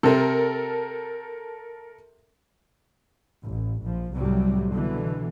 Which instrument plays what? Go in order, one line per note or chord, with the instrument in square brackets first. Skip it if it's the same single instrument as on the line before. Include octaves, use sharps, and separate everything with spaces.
[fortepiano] C3 [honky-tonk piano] A4 A#4
[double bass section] A1
A#1 F3
C2 A2 C3 F#3 G3
B2 D3 E3